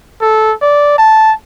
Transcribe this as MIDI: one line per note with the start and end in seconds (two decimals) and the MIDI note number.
0.21 0.53 69
0.62 0.96 74
0.98 1.32 81